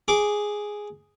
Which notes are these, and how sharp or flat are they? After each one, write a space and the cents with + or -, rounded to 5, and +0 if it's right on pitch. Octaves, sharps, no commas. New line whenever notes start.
G#4 +0 D6 -5